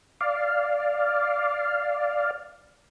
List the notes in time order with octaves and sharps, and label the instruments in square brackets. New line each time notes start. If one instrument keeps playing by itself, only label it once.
[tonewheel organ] D5 F5